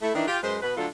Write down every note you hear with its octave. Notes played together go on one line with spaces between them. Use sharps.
A3 E4
D#3 E3 D4
F4 G4
F#2 G#3 B4 C5
B2 B4
D3 F#3 A3 D4 F4 A4